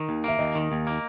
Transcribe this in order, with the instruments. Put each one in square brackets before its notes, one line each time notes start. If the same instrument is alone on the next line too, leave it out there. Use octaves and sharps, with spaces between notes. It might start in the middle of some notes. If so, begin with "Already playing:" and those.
Already playing: [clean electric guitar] D#3
D#2
[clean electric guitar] A#3 [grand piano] E5
[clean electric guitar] D#2 [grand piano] D#5
[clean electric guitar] D#3
D#2
A#3